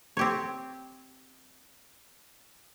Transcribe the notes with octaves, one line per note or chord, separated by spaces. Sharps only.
C4 G4 C#5